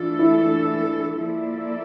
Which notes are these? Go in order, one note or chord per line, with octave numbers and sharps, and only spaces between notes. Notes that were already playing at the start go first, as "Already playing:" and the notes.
Already playing: E3 A3 D4 F4 A4
E4
F3 A#3 E4 A4 D5